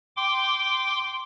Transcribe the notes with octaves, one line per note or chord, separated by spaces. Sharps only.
G5 C6 D6